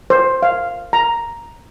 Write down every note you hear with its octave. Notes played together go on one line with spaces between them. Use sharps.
C5
F5
A#5